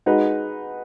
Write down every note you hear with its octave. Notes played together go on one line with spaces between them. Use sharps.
G#3 D#4 F#4 B4